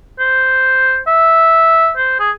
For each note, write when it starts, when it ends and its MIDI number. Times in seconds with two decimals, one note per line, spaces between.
0.19 0.97 72
1.07 1.92 76
1.97 2.17 72
2.20 2.31 68